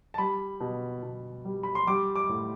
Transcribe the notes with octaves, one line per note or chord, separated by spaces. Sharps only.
A5
G3 B5
B2
B2
G3
B5
C6
G3 D6
D6
A2